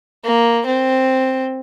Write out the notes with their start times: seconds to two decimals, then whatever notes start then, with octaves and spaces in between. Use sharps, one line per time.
0.24 A#3
0.66 C4